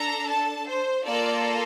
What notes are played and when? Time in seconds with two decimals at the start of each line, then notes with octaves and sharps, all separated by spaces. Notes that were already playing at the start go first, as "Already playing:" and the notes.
Already playing: D4 A4 A#5
0.29 A5
0.68 C5
1.05 A#3 F4 A4 D5